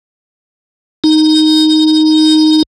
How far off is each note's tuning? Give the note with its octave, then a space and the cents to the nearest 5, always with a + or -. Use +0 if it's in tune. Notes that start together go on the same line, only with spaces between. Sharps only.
D#4 +0